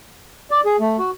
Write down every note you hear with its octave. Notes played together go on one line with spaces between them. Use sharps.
D5
G#4
A3
F#4